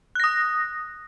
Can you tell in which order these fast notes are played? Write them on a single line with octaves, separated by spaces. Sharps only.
F#6 A#6 D#6